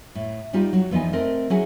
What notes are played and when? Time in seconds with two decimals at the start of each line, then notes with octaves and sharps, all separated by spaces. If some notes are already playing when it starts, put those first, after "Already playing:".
0.15 A2
0.53 G3 D#4 F4 G4
0.73 F#3 F#4
0.91 E2 F3 B3 D#4 D#5 G#5
1.13 A3 C4 A#4 D#5
1.50 F#3 C#4 E4 F#4 G#4